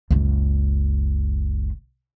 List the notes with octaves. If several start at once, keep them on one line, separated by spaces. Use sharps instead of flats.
F#1 C#2